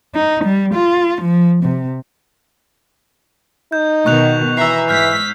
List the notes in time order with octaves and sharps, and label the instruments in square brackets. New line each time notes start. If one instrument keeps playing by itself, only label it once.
[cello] D#4
G3
F4
F3
C3
[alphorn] D#4 [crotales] G6
[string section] B2 D#3 [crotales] C#6 F#6 F7
[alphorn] E3 [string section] E5 A#5 [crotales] E6 C7
[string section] G#2 B6 [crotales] F6 G6